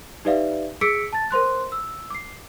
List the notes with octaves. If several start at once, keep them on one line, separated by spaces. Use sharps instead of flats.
D#4 G4 B4 D5 E5 F5
G#4 D6 E6 B6 C#7 D7
A5 A6
A#4 C5 C6 F#6
E6
D6 C7